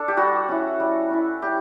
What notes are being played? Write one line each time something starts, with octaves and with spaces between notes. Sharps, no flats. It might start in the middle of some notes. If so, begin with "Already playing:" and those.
Already playing: D4 A4
G4
G3 F#4
C#4 E4
G3
C#4 E4
G3 G4